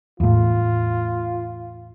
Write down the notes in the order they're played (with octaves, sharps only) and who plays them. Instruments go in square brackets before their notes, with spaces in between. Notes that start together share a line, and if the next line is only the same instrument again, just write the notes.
[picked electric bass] E2 A2 [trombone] F4